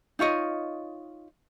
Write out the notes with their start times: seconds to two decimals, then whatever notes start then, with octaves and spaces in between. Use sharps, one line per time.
0.19 D#4 F4 C#5 D#5